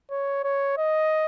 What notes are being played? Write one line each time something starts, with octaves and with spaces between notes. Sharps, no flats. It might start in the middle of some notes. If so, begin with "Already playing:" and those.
C#5
C#5
D#5